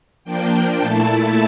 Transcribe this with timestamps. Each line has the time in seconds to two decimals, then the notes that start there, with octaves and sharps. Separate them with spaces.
0.24 F3 A#3 D4 G5
0.80 A#2 A3 E4 A5